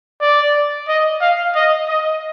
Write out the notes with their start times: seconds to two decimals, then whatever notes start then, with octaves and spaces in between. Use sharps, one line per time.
0.21 D5
0.88 D#5
1.21 F5
1.55 D#5
1.88 D#5